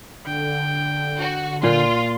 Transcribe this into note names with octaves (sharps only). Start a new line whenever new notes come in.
D3 G5
F#4
A#2 F4 F5 C6